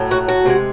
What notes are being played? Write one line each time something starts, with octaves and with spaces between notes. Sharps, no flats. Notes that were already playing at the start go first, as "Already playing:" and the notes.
Already playing: A2 F#3 A3
F#4
F#4
C3 E3 G#3